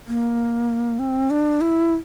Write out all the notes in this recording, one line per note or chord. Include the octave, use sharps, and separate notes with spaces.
A#3
C4
D4
E4